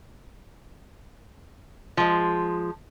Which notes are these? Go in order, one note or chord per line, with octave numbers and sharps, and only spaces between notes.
F3 G#3